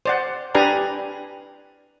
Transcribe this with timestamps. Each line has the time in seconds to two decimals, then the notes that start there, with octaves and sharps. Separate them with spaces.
0.05 C5 D5 F#5
0.54 D4 G4 B4 D5 G#5 A#5